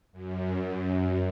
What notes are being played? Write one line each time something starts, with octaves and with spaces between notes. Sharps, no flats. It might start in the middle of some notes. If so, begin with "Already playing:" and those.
F#2